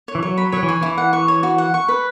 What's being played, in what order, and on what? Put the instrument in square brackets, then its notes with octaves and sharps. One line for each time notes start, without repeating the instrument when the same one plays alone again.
[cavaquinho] C#5
[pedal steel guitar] E3
[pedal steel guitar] F#3 [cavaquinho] C#5
[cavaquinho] B5
[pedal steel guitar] F#3 [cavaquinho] C#5
[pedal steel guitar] E3
[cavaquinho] G#5
[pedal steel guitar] E3 [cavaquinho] E4
[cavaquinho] F#5
C#6
C#5
F#4
F#5
C#6
B4